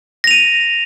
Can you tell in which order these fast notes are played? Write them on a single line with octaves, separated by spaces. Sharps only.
A#6 F7 D#7